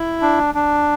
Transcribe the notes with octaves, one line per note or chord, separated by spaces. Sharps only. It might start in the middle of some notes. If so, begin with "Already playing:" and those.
Already playing: E4
D4
D4